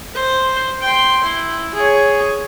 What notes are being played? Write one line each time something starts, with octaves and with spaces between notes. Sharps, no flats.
C5
G5 C6
E4
G#4 C#5